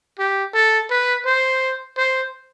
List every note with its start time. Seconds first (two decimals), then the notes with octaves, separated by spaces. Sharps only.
0.19 G4
0.54 A4
0.91 B4
1.26 C5
1.97 C5